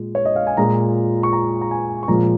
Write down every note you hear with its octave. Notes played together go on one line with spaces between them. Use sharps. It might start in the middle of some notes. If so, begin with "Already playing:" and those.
Already playing: A#2 G#3
C#5
D#5
F5
G#5
A#2 G#3 A#5
C#6
A#5
A#5
G#5
C#6
A#2 F3 G#3 A#5